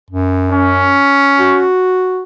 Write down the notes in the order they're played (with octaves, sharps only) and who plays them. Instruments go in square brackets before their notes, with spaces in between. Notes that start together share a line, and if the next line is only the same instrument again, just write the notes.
[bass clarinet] F#2
[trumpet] C#4
[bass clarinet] F#4